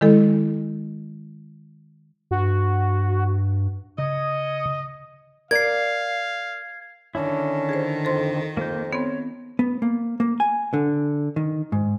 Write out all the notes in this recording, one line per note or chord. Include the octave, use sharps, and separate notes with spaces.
D#3 G#3 E4 A4
G2 F#4
C#3 D#5
A#4 D5 F5 G#6 C7
D3 D#3 C#4 D4 E4
G#4 C5
F2 A4 C5 C6
F2 A#3 G6
B3 C4 C#5
B3
A#3
A#3
G#5
D3
D#3
G#2